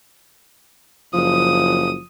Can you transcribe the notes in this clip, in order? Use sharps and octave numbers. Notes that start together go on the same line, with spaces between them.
F#1 F3 D#6